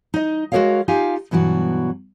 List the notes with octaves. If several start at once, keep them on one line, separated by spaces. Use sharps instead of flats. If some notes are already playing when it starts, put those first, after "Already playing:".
D#4 D#5
G#3 F#4 G#4 A#4 C#5 F5
D#4 F4 G4 F5 G#5
G2 B2 E3 F#3 F#4